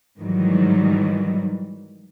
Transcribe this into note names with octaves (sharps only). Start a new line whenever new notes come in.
G#2 D#3 E3 F#3 G3